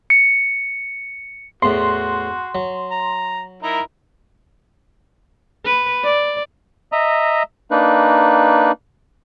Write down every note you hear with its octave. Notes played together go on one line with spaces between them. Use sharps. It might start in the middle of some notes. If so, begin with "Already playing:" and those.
C#7
E2 A2 F#4 C6
F#3
A#5
D#4 E4 A#4
B4
D5
D#5 E5 A#5
A#3 D4 D#4 B4